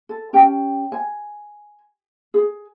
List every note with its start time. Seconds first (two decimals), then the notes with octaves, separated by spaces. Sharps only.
0.09 A4
0.33 C#4 G4 G5 A5
0.92 G#5
2.34 G#4